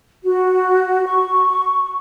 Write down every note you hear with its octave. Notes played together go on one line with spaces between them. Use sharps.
F#4
C#6